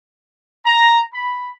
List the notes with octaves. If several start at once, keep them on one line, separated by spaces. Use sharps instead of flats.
A#5
B5